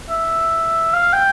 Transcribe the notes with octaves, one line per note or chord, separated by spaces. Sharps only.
E5
F5
G5